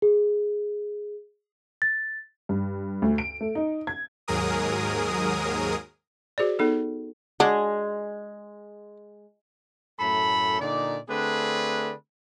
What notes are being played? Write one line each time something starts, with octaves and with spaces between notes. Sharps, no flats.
G#4
A6
G2
D2
D7
A3
D#4
G#6
D#2 G#2 F#3 G#4 A#4 D#6
F#4 G#4 C5 D5
B3 D#4 A4
G#3 D4 F#4
F#2 A2 A3 A4 B5
A#2 D3 D#4 D5
D3 A3 C4 D4 G#4 B4